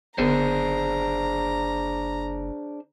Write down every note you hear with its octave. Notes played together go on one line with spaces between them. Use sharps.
F#1 D3 B3 D4 G#4 C5 A#5